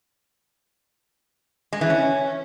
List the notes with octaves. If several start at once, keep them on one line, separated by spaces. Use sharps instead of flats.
G#3
E3
C#4